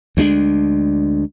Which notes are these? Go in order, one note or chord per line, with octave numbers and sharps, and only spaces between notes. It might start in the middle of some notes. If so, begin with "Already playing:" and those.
D2 G#3 C#4 D4